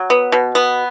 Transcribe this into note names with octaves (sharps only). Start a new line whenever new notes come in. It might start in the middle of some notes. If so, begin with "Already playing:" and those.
Already playing: F#3
B3
B2
B3